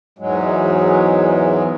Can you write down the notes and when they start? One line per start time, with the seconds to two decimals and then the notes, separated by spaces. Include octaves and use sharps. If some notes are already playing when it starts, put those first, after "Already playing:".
0.19 E2 G#2 F#3 G#3